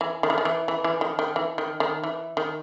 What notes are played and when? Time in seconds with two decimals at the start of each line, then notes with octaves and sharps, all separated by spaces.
0.01 E3
0.23 D#3
0.30 E3
0.38 D#3
0.45 E3
0.68 E3
0.84 E3
1.01 D#3
1.19 D#3
1.36 E3
1.58 D#3
1.80 D#3
2.03 E3
2.37 D#3